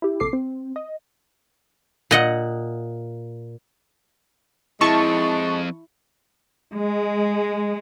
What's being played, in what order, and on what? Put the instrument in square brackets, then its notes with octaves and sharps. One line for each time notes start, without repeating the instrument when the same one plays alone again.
[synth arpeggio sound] E4 G4
A#1 C3 A4 D6 C7
C4
D#5
[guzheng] A#2 D#5 F#5
[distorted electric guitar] F2 [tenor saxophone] G#3 [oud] E4 [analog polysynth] A5 C#6
[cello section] G#3